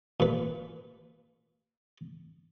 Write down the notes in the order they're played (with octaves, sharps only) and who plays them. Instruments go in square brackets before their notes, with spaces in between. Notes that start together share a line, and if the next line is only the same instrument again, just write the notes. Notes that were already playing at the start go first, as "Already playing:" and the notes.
[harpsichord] A#2 B4